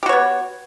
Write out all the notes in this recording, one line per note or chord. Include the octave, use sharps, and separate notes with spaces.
B3 F#4 G4 C#5